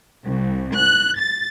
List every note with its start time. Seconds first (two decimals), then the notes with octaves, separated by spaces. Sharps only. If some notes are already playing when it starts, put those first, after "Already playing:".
0.24 C2
0.77 F#6
1.18 A6